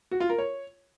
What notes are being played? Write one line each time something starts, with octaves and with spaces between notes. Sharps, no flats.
F#4
F4
A#4
C#5